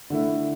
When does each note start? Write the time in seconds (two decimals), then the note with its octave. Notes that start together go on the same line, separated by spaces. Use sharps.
0.10 D3 A3 E4